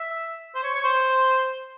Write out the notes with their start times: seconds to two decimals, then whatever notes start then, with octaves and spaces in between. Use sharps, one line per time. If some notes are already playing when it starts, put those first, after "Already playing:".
Already playing: E5
0.55 C5
0.63 C#5
0.74 C#5
0.84 C5